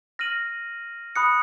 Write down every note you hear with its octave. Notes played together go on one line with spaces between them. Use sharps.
F6 A#6 D#7 F#7
B5 D#6 F#6 C#7